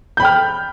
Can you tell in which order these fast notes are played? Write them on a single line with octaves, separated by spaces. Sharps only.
G6 B5 G5 F6